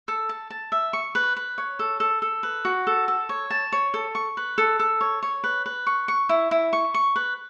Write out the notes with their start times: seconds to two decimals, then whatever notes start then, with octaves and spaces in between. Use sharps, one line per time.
0.08 A4
0.29 A5
0.50 A5
0.72 E5
0.93 C#6
1.15 B4
1.37 B4
1.58 C#5
1.79 A4
2.00 A4
2.22 A4
2.43 B4
2.65 F#4
2.87 A4
3.08 A4
3.29 C#5
3.50 A5
3.72 C#5
3.94 A4
4.15 C#6
4.37 B4
4.58 A4
4.80 A4
5.01 C#5
5.23 C#5
5.44 B4
5.66 B4
5.87 C#6
6.08 C#6
6.29 E4
6.51 E4
6.73 C#6
6.94 C#6
7.16 B4